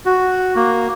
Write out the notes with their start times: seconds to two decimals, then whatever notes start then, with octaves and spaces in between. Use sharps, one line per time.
0.06 F#4
0.56 A#3